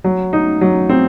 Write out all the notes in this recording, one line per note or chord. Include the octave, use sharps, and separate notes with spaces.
F#3
D#4
F#3
C4